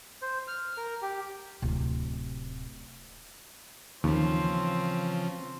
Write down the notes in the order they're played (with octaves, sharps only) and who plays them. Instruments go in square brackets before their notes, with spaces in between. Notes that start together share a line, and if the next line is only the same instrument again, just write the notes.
[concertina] C5
F6
A#4
G4
[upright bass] D1 C3
[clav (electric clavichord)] D#2 [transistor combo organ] C#3 F3 [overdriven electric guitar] E3 B5 [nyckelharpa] C4